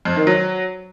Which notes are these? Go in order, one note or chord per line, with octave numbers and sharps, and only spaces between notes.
F2
D#3
F#3